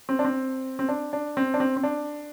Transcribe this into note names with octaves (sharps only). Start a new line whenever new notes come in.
C4
D4
C4
C4
D4
D4
C4
D4
C4
C4
D4